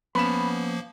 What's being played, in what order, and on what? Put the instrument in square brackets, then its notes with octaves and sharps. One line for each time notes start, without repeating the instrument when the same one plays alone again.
[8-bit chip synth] F3 A#3 [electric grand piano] B3 C#4 E7 [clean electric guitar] B5